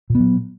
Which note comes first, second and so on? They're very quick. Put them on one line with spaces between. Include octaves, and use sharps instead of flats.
A#2 B3 F#3